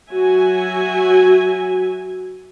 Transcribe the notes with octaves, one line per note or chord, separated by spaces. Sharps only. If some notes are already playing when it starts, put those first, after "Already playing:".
F#3 F#4 E5 G#5